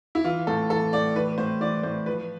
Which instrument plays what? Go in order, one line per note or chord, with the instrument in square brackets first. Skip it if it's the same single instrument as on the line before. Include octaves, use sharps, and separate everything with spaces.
[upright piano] E4
E3 F4
A2 A4
E3 A4
A2 D5
E3 B4
A2 C5
E3 D5
A2 C5
F3 B4